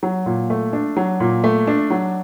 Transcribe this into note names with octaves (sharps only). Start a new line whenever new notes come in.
F#3
A#2
A3
D4
F#3
A#2
A3
D4
F#3